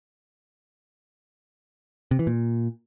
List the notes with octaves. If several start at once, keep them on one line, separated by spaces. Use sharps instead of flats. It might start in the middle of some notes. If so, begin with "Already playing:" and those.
C3
E3
A#2